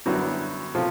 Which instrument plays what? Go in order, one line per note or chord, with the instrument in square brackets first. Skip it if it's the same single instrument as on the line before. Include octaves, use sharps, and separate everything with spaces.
[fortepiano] F#2 D3 G3 B3 E4 [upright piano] F#3 F#4
[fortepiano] C3 A3 C4 [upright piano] F3 F4